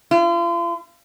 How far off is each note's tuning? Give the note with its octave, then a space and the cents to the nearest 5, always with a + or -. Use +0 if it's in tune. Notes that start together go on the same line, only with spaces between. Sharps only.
F4 -40